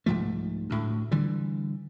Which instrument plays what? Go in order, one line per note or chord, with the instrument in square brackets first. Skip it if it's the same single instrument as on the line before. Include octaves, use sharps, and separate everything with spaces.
[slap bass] C2 G#2 F3 A3
D2 A2
D3 E3 G3